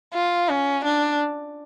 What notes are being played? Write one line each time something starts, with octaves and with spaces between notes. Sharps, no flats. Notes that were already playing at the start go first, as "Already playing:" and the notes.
F4
C#4
D4